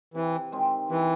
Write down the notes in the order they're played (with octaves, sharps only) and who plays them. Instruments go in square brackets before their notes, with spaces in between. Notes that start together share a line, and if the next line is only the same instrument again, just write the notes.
[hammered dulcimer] C3 [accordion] E3
[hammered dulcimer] D#3 G#3 C4
[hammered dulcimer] C3 [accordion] E3